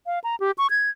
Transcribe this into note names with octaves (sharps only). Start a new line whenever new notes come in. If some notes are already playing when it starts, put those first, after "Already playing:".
F5
A#5
G4
C#6
G#6